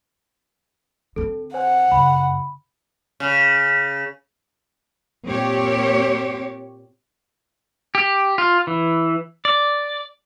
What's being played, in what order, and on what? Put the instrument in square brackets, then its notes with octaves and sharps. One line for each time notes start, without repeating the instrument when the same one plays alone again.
[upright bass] D3 C4 [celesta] A4
[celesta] C5 G#5 [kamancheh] F#5
[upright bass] F#2 C#3 [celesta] B5
[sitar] C#3
[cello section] A#2 C4 G4 C#5
[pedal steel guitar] G4
F4
E3
D5